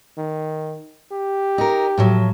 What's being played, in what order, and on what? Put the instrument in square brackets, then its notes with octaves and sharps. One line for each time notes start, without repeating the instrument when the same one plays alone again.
[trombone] D#3
G4
[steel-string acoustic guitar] D#4 A#4
A2 F3 F#3